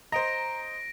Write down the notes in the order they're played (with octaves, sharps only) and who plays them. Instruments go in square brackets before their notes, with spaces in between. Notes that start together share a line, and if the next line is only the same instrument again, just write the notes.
[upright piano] C5 D#5 [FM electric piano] A#5 [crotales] A#6 D7